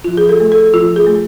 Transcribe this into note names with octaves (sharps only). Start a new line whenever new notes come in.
F3 F4
G#4
A4
A3
A4
F3 F4
G#4
A3